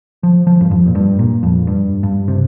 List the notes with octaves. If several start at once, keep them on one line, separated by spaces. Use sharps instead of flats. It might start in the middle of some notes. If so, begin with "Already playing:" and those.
F3
F3
G2
F2
A#2
G2
A#2
F2
G2
G2
C3